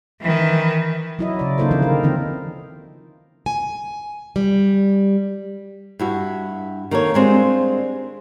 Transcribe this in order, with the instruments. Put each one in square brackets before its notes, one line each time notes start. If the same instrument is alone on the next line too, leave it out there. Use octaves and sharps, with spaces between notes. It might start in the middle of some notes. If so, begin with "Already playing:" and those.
[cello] D#3 E3
[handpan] F#3 E4 D#5
C#3 D5
C#3 A#3 D#4 F4 A4 C5
D3 D#3 F3 C4 D#4 E4
A#4
D3 E3 C4 E4
[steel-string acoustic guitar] G#5
G3
[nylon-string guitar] G2 E4 F#4
D#3 A#3 A4 C#5
G3 G#3 C4 D4 F4